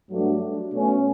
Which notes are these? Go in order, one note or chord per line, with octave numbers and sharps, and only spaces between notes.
G2 F#3 A3 D4 F#4
B2 A3 C#4